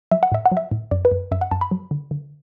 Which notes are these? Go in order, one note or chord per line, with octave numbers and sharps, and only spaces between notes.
F#3 E5
F#5
A2 E5
F#5
F#3
E5
A2
F#2 D5
B4
F#2
F#2 E5
F#5
F#2 A5
B5
F#3
D3
D3